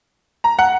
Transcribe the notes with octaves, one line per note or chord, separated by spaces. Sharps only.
A#5
F#5